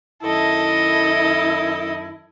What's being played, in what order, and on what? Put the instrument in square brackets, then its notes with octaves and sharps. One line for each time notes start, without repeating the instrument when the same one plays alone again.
[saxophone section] F#2 D#3 E4 [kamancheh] A4 D#5